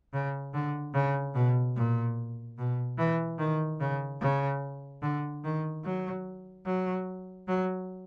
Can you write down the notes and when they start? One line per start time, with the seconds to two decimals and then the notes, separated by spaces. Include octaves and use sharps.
0.13 C#3
0.54 D3
0.94 C#3
1.35 B2
1.76 A#2
2.58 B2
2.98 E3
3.39 D#3
3.80 C#3
4.21 C#3
5.02 D3
5.44 D#3
5.84 F#3
6.66 F#3
7.48 F#3